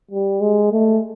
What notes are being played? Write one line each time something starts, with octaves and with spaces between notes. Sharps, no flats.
G3
G#3
A3